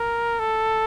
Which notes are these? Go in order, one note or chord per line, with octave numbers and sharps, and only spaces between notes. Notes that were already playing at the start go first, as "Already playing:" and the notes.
Already playing: A#4
A4